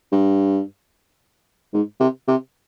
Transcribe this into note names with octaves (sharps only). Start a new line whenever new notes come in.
G2
G#2
C3
C3